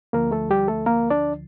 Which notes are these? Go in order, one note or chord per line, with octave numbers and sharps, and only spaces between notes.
D2 D3 F3 A#3 A#4
A3 A4
G3 G4
A3 A4
A#3 A#4
D4 D5